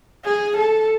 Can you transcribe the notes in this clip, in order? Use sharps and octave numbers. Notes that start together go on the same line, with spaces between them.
G#4
A4